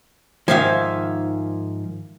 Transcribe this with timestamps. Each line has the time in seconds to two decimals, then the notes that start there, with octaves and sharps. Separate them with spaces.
0.48 G#2 D#3 F3 E5 F5 G#5